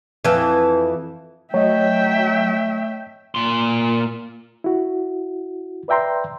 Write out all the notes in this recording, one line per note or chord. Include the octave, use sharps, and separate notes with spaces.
F2 E3
F#3 A3 C#5 D#5 E5 G5
A#2 C6
E4 F#4
B4 D5 E5 G5 A#5 C6